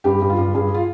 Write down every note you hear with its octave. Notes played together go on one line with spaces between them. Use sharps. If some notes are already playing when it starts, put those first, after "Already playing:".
G2 G4
G2
F4
G2
G2 G#4
F4